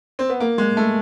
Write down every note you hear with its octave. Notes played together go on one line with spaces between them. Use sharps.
C4
B3
A#3
G#3
A3